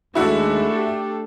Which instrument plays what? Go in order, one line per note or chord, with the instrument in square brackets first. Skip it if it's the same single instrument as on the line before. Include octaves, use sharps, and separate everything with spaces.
[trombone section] D#2 G#3 [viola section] A3 D4 A4 [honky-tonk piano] E4 F#4 E5
[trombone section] G4